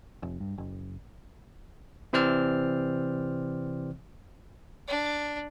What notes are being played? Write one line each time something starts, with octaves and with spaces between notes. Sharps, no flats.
F1
G2
F#1
C3 E3 C4 C5 D5 F6
D4